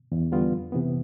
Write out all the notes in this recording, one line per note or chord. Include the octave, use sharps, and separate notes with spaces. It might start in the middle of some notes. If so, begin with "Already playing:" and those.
E2
D3 G3 B3 F4
F2
C3 E3 B3